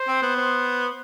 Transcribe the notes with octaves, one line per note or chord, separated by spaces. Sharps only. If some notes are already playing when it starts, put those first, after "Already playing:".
Already playing: C5
C4
B3
C5